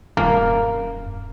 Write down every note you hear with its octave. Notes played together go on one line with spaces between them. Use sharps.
D#1 F#2 A#3